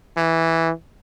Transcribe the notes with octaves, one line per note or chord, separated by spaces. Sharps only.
E3